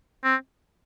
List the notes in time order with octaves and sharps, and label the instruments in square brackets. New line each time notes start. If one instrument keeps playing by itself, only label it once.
[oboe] C4